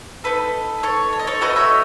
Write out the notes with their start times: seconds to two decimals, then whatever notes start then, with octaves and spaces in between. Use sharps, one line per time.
0.24 D#4 A4 B4
0.83 A4 C#5
1.13 C#5
1.20 D#5
1.27 A4 C#5
1.41 A3 C#4 F#4 B4 D#5
1.56 C#5 E5